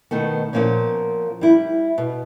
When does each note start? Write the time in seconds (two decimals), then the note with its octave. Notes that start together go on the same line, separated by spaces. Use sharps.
0.11 B2 D#3 A3 B3
0.53 A#2 F3 A#3 B3 C#4
1.41 G3 E4
1.98 B2